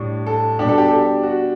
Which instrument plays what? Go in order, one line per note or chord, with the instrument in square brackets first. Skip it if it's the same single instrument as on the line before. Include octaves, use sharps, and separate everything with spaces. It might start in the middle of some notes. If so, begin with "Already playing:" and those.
Already playing: [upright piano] A2 G3 D4
A4
B2 G3 D4 G4
A4
G4
A4
G4
F#4